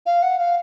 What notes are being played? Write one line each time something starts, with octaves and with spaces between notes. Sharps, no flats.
F5
F#5
F5